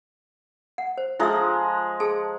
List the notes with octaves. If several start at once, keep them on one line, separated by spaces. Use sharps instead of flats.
F#5
C5
F3 G#3 F4 E5 A#5 E6
G#4 A4 A5